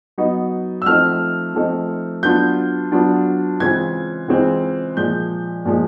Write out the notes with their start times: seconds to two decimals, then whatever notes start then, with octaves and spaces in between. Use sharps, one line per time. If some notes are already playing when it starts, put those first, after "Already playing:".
0.18 F#3 B3 D#4
0.82 E6
0.86 F3 A3 C4 D#4 F6
1.54 F3 A3 C4 D#4
2.23 F#3 B3 D4 F4 G6
2.92 F#3 B3 D4 F4
3.60 C#3 E3 G#3 C4 F4 G#6
4.28 C#3 E3 G#3 C4 F4
4.97 A#2 F3 G#3 G6
5.65 A#2 F3 G#3